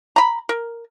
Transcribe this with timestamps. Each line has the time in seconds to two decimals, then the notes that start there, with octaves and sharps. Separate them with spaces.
0.16 A#5 B5
0.49 A#4